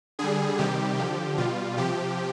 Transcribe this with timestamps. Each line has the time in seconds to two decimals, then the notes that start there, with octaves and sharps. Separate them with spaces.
0.19 D3 G3 G#4
0.59 C3 D#3 G3 G4
0.98 D3 F3 G4
1.38 B2 G3 F4
1.77 C3 F3 G4